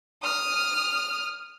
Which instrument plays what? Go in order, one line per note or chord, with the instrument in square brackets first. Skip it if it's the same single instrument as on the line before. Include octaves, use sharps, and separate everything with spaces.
[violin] D#6 F6